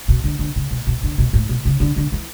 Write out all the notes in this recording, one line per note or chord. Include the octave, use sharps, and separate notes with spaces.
B2
D3
D3
C#3
B2
B2
D3
B2
A2
B2
C#3
D3
D3
E3